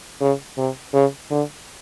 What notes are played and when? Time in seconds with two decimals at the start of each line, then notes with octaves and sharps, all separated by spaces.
0.21 C#3
0.58 C3
0.94 C#3
1.31 D3